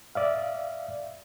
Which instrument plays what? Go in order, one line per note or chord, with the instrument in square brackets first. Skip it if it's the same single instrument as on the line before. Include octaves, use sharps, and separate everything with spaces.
[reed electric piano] D5 E5 F5